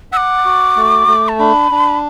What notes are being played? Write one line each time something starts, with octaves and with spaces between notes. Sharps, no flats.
F#5 D6 E6
F#4
A3
A3
A5
D4 B5
D4